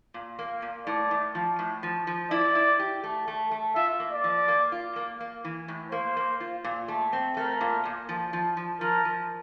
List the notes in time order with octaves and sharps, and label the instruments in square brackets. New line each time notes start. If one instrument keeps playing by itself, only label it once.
[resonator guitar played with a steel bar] A#2
A#3
A#2
[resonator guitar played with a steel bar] A2 [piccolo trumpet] D5
[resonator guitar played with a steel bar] A2
F3
A2
F3
F3
[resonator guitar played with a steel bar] E4 [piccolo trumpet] D5
[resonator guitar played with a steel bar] E4
G4
A3
A3
A3
[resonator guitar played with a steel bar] F4 [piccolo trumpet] E5
[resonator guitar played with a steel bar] A#3
[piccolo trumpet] D5
[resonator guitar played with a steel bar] F3
A#3
F4
A#3
A#3
E3
A2
[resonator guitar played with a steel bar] A#3 [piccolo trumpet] C5
[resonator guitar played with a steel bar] A#3
F4
A#2
A3
C4
[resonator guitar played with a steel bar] A3 [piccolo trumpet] A#4
[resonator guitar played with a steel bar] A#2
A#2
F3
F3
F3
[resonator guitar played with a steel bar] F3 [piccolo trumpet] A#4
[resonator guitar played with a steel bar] F3